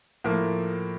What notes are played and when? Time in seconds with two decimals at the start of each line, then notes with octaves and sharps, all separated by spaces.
0.24 A2 F3 A#3